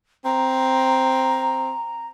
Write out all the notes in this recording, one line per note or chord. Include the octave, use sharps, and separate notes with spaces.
C4 A#5